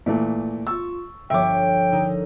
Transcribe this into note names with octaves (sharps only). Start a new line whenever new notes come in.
A#2 E3 A3
F4 A5 C#6 E6
G1 F3 C#5 E5 G5 D6
D3 D#4 A#4